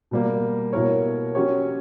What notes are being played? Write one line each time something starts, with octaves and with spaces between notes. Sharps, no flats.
B2 G3 A#3
B2 A#3 E4 A#4 C#5
F#3 C#4 G4 C#5